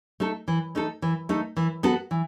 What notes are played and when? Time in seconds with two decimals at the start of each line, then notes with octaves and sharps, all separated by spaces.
0.20 A3 D#4 A4
0.48 E3
0.75 A3 D#4 A4
1.02 E3
1.29 A3 D#4 A4
1.57 E3
1.83 B3 F#4 A4
2.11 E3